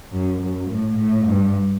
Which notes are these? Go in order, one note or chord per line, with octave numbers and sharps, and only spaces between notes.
F#2
F#2
A2
A2
G2